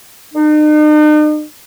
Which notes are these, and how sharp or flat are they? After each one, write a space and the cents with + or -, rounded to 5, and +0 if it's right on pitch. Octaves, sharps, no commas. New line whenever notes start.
D#4 -45